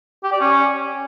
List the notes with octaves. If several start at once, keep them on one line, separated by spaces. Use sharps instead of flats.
G4
D5
C#4